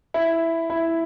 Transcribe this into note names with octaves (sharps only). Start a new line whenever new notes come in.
E4
E4